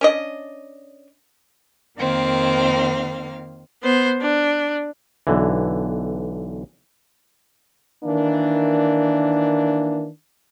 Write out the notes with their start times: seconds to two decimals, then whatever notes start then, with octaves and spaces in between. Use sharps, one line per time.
0.01 C#4 D4 D#5
1.98 F2 D#3 A#3 C4 F5
3.83 B3 C5
4.21 D4
5.27 B1 D3 E3
8.04 D#3 E3 A#3 D4